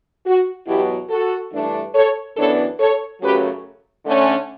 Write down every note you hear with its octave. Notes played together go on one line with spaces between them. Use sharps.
F#4
E2 B2 F#3 E4 G4
F#4 A4
G2 E3 A3 D4
A4 C#5
F#2 E3 B3 D4 A4 C#5
A4 C#5
F#2 C#3 F#3 A3 G4 B4
D3 A3 C#4